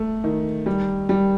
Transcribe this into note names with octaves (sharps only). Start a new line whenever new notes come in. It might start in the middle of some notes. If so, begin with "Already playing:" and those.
Already playing: A3
D#3
G3
G3